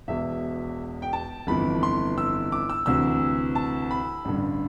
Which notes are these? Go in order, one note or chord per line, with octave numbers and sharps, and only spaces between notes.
E1 E2 B2 E5
G5
A5
G1 F2 E3 B5
C6
E6
D6
E6
D2 C3 E3 E6
A5
B5
A1 G2 D3